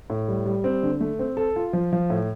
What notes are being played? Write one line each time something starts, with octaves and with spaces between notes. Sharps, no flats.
A2
G3
G3
C4
D3
A3
C4
A4
F4
F3
F3
A2